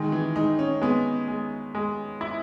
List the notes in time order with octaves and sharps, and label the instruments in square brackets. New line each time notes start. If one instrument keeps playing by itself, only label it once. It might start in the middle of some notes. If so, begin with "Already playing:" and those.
Already playing: [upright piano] D#3 [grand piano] G#3
[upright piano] E3
[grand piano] G#3 [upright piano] D#4
[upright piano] C#4
[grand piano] G#3 [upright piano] B3
[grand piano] G#3
G#3
E4